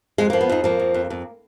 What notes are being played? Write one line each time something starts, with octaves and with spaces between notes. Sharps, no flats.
F2 G#3
A#3
F3
B3
F2 D#4
F3 A#3
F2
F2
F2